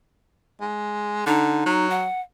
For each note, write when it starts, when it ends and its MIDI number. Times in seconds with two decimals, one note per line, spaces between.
0.61 1.23 56
1.26 1.64 50
1.26 1.87 63
1.66 2.07 54
1.90 2.20 78